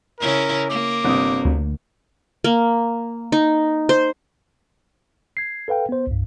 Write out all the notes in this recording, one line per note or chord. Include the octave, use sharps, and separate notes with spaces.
C#3 C#4 E4 A#4
A#3 D6
G1 C3 D#6
D2
A#3
D#4
C5
G#6 C7
A4 B4 F5 G5
B3 C5
C2 G2